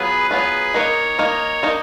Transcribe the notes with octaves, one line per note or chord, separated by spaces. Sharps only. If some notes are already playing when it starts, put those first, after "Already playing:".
Already playing: F#3 B3 F4 G#4 B4
F#3 B3 F4 G#4 B4
D#3 A#3 D#4 A#4 C#5
D#3 A#3 D#4
D#3 A#3 D#4